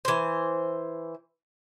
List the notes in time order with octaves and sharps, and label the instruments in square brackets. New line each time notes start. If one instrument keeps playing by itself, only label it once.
[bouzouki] E3 C5